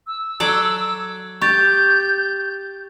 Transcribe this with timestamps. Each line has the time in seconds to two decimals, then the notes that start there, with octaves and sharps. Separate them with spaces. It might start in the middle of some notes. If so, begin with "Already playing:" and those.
0.07 E6
0.40 F#3 A4 D5
1.42 G4 C#6 G6 A6